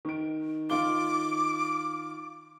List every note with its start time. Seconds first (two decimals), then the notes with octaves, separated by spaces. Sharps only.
0.05 D#3 D7
0.70 D#3 F4 D6 G7